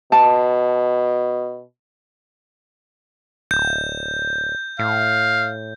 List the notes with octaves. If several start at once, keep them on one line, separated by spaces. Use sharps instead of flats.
B2 A5
D1 G6
A2 F5